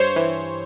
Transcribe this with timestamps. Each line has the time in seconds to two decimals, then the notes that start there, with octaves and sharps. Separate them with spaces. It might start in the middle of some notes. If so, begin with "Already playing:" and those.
Already playing: G2 C5 C#5
0.16 E3